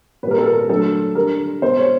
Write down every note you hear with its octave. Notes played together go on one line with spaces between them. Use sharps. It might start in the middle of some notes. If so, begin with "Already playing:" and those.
A#2 G3 A#4 B4
A4
A#4
D3 F#3 A3 A4
D3 G3 A#4
B2 G#3 C5
C#5